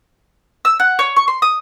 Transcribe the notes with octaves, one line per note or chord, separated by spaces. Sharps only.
E6
F#5
C#5
C#6
C6
D#6